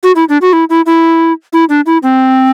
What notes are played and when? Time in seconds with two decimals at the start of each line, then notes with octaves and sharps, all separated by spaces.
0.03 F#4
0.16 E4
0.29 D4
0.42 F#4
0.53 E4
0.70 E4
0.86 E4
1.53 E4
1.69 D4
1.86 E4
2.03 C4